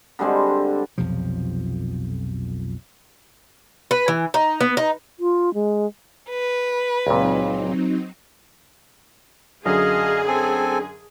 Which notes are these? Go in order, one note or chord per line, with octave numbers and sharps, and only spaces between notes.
D3 G3 G#3 C4
B1 F2 C3 F3
B4
E3
D#4
B3
D#4
F4
G#3
B4
C#2 A#2 F#3 C4 D#4
F#2 D3 F#3 G#4 D#5 F5
C4 A4 G#5